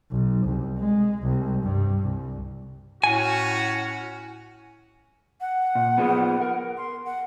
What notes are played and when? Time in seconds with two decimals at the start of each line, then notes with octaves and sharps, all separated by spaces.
0.12 B1
0.46 C2
0.77 G#3
1.23 C2
1.63 G2
2.04 C2
3.04 A2 C#4 F#4 G#5
5.41 F#5
5.75 A#2
5.98 B3 F4 G#4
6.41 A#4
6.77 C6
7.05 F#5